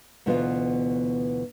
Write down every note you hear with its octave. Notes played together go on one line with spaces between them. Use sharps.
D2 B2 E3 B3 F4